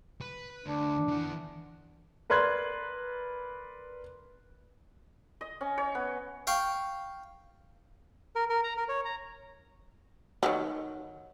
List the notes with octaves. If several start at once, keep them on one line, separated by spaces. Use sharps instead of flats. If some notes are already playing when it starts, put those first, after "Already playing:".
B4
D2 D4
E3 F#5
A#4 B4 D5 C6 F#6 G#6
D#5
C#4
C#5
B3
F5 G5 C#6
A#4
A#4
A#5
A#4
C#5
A#5
D#3 E3 F#3